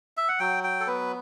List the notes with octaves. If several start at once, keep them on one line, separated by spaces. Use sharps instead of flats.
E5
F#5
F#3 G5
G5
A4
B3 B4